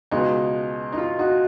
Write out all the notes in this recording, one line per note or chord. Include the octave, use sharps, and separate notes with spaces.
C#2 B2 G#3 B3 D#4
D#4
F4
D#4 F#4